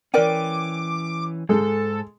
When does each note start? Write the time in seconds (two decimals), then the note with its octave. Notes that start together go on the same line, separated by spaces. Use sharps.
0.14 E3 C#4 A#4 D5 G5 D6
1.49 G#2 G#3 A4